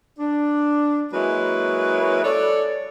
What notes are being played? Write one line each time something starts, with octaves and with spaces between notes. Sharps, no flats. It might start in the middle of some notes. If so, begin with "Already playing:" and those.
D4
F#3 G#3 A#3 C#4 E4 B4
A4 C#5 D5